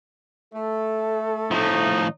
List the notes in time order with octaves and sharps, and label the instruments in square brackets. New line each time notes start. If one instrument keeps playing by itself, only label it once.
[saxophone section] A3 [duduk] A4
[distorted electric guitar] A2 F3 [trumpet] D#4